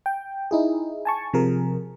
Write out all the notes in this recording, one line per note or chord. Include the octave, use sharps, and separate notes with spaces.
G5
D#4 E4 G#4
G#5 A5 C#6
C3 F3 G#4 A#4